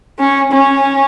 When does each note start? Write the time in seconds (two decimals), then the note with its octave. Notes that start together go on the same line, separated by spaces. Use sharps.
0.19 C#4
0.52 C#4